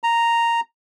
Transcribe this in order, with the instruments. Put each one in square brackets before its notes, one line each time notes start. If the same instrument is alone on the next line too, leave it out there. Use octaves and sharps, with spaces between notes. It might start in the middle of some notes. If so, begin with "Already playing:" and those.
[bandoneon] A#5